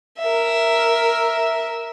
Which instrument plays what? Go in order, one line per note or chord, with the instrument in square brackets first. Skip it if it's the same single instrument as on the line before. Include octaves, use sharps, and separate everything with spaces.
[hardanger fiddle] A#4 E5